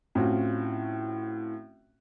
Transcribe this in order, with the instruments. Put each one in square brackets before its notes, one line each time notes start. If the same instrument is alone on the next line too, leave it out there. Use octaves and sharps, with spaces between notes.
[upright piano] A2 C4 C#4 F4 F#4